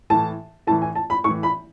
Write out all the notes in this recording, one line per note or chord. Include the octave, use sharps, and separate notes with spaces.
A2 E3 A5
A2 E3 A5
G#5
A5
B5
A2 E3 C#6
B5